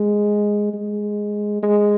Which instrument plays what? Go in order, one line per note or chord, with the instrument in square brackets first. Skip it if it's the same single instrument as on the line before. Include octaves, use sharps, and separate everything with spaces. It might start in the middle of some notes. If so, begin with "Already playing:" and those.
Already playing: [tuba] G#3
G#3
G#3